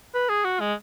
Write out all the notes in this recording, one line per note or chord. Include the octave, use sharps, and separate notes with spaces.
B4
G#4
F#4
G#3